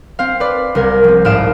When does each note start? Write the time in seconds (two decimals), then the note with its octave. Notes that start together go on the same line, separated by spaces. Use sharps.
0.19 C4 F5
0.40 B4 D5
0.75 C2 A#4 G#6
1.04 F3 C4
1.25 G#1 A2 F5 D#6 D7 E7